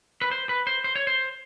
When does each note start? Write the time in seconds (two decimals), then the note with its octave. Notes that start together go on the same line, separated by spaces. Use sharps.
0.22 B4
0.31 C5
0.49 B4
0.67 C5
0.84 C5
0.96 C#5
1.07 C5